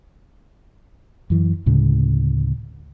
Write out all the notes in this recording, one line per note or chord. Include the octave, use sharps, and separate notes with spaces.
F#2 E3
D2 A2 C#3 G#3